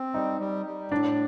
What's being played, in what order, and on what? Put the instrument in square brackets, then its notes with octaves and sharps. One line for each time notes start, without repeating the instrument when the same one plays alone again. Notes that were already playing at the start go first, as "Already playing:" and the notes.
Already playing: [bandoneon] C4
[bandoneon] G3 [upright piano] D#4
[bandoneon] G3
G3
[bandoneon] A2 [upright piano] D4